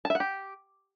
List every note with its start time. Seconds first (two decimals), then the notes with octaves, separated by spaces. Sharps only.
0.05 A5
0.10 E5
0.15 F#5
0.20 G4